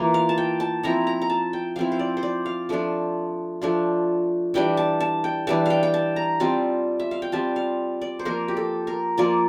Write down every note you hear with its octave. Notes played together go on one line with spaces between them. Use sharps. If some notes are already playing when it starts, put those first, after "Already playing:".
Already playing: E3 A#3 F4
F5
A5
G5
A5
F3 C4 E4 A#5
A#5
A#5
A5
G5
F3 C4 E4 F5
C5
D5
C5
D5
F5
F3 A3 D4 F4
F3 A3 D4 F4
E3 G3 D4 G5
A5
A5
G5
E3 G3 D4 A5
F5 G5
G5
A5
A#5
G3 C4 F4 A5
E5
F5
G5
G3 C4 F4 A5
F5
D5
C5
F3 A#3 F4 A#4
G4
A4
A#4
F3 A#3 F4 D5